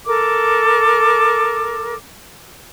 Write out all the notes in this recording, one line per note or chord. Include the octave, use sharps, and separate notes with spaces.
A4 A#4 D6